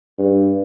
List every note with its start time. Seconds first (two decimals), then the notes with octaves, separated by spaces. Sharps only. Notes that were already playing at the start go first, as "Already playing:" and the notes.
0.18 G2